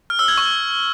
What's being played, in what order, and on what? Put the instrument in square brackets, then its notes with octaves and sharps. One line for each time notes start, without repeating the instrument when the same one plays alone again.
[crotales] F6
E6
G#6
C#6